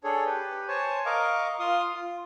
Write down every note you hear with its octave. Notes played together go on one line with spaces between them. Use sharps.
D4 G#4 A4 C#5
G4 B4
C5 C#5 G#5 A5 C#6
A#4 D#5 F5 C#6 D6
F4 F5 C6 D#6
F4